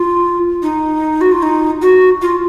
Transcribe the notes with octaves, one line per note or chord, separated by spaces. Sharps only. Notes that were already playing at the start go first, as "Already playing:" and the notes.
Already playing: F4
D#4
F#4
F4
D#4
F#4
F4